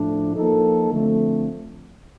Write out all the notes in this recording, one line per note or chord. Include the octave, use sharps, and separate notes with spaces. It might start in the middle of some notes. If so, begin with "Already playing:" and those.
Already playing: A2 F3 A3 D4
F3 A#3 D#4 A4
D3 F3 A3 C4